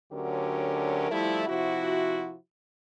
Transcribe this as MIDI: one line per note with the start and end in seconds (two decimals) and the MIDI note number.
0.13 1.09 38
0.13 1.09 50
0.13 1.09 54
0.13 1.09 61
0.13 1.09 67
0.13 1.09 70
1.10 1.46 53
1.10 1.46 55
1.10 1.46 57
1.10 1.46 64
1.47 2.36 48
1.47 2.36 53
1.47 2.36 64
1.47 2.36 66